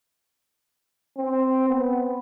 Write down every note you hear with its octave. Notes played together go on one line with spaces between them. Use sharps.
C4
B3